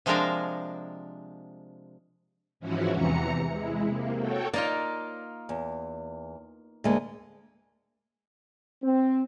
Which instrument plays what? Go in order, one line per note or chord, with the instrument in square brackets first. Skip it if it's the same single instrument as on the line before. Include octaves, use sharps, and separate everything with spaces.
[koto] C3 F3 G#3 D4 A#4 F5
[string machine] G#2 E3 F3 C#4 E4 F#4
E2 C3 E3 A#5 C#7
G#3 E4
C3 A#3
F#4 A4 C#5 G5
[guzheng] A#3 D#4 F4 [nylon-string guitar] C#5 D5
[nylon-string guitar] E2
D2 G#3 A#3
[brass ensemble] C4